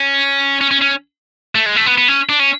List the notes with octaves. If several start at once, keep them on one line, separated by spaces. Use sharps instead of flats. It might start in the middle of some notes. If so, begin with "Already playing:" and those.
Already playing: C#4
C#4
C#4
C#4
A3
G#3
A3
B3
B3
C#4
D4
C#4